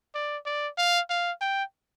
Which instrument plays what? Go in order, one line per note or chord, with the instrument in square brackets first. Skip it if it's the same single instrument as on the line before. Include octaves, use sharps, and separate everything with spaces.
[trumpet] D5
D5
F5
F5
G5